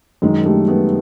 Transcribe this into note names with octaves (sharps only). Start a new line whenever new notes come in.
F#2 D#3 G#3
G3 A3
A3 B3